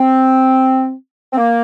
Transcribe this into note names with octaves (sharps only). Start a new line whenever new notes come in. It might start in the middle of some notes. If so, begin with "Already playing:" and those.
Already playing: C4
C4
A#3